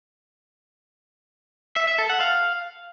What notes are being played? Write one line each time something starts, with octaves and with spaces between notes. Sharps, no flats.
E5
E5
A4
F#5
F5